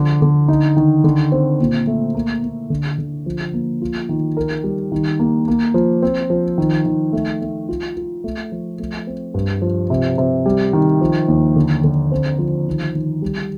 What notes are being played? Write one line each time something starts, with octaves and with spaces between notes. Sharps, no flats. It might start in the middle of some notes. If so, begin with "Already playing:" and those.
Already playing: D3 F3
D3
D#4
D#3
D3
C4
A#2
A3
A#3
A#3
D3
D3
F3
A#3
F4
D#3
A#4
G3
D#3
A#3
A#3
F3
C4
F3
D#3
D#3
A3
A3
F4
F4
A3
F3
A3
C4
G2
F3
C3
C3
G3
D#3
F3
D#2
D3
D3
C4
F3
D#3
D#3
G3